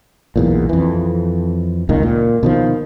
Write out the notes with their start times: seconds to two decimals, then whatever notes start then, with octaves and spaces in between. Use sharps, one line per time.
0.36 B1 E2 A#2
0.69 F2 E3
1.89 C#2 A#2 D#3
2.03 A#2
2.43 B2 D#3 F3